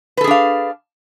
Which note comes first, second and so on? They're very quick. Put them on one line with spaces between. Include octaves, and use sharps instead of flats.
B4 A4 G#4 D4 F5